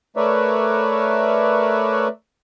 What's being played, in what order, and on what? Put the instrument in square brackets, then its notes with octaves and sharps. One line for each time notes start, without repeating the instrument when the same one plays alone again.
[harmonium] A3 A#4 B4 C#5 D5 E5